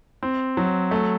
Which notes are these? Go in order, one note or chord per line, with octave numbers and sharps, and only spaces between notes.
C4
F#3
A3